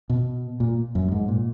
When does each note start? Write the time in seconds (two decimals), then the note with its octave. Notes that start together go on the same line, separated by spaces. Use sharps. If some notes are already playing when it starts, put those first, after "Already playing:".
0.10 B2
0.60 A#2
0.95 F#2
1.12 G#2
1.28 A#2